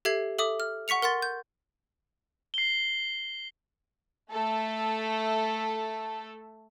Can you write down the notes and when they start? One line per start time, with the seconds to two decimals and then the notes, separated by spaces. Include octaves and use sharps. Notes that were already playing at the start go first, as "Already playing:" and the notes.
0.05 G4 A4 E5 G#6 C7
0.38 A4 E5 D6 D#6
0.60 F6
0.88 F#5 C#6 B6 C#7 F7
1.02 A#4 F#5 C6 A6
1.22 G6
2.54 C7 G7
4.30 A3 A4